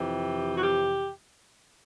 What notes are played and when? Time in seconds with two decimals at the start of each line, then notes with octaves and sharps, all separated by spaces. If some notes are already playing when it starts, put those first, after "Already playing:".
Already playing: F2 C3 E3 G4
0.56 F#4
0.61 G4